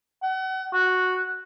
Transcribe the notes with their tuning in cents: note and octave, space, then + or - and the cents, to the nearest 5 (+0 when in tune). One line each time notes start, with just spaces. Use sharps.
F#5 +35
F#4 -5